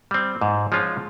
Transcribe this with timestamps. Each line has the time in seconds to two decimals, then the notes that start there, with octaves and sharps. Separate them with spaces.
0.11 G3 C4
0.41 G#2
0.72 F3 G#3 C#4 F4